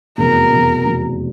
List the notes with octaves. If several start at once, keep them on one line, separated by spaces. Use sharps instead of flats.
F1 E2 B2 F#3 A#4
F1 E2 B2 F#3
F1 E2 B2 F#3